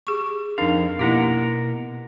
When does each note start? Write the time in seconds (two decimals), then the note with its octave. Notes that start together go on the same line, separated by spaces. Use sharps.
0.07 G4 G#4 C#6
0.58 F2 D4 D#4 A#4 F5
0.99 B2 A#3 E4 G4 A#4 F#5